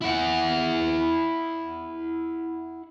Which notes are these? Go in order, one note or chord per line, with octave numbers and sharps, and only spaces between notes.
E4 F#5